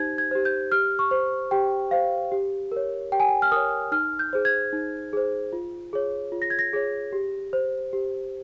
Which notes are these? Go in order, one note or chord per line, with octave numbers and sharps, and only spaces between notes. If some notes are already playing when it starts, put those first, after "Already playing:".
Already playing: D#4 G4 C5 G#6
G#6
G4 C5
G6
G4 F6
C#6
C5
G4 G5
C5 F5
G4
A#4 C#5
G4 G5
G#5
G5
F6
A#4 C#5 D#6
D#4 F6
G6
G#4 C5
G#6
D#4
G#4 C5
F4
G#4 C#5
F4
A#6
G#6
A#6
G#4 C#5
G4
C5
G4